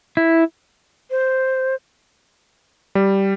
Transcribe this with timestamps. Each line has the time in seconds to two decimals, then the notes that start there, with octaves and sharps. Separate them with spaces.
0.17 E4
1.11 C5
2.95 G3